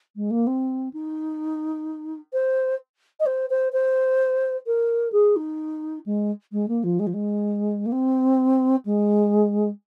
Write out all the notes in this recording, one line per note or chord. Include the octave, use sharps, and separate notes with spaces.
G#3
A#3
C4
D#4
C5
D#5
C5
C5
C5
A#4
G#4
D#4
G#3
G#3
A#3
F3
G#3
F3
G#3
A#3
C4
G#3